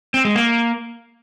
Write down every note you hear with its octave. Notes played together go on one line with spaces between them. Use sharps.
C4
G#3
A#3